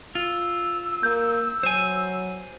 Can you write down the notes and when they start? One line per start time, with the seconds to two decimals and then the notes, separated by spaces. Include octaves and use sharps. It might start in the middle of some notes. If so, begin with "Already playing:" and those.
0.15 F4 E6
1.03 A#3 G6
1.63 F#3 C5 G#5